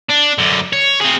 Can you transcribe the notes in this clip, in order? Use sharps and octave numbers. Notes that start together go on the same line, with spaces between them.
D4
F#2 D3
C#5
C4 G#4